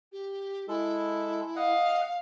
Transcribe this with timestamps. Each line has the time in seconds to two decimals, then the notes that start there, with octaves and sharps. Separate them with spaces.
0.12 G4
0.68 G#3 E4 A4
1.56 D#5 F5 F#5